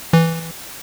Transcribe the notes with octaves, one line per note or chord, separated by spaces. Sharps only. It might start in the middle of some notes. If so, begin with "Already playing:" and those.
E3